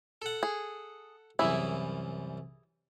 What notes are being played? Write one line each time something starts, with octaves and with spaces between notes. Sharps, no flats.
A4 F#5
G#4
C2 F#2 E3 E4 G#4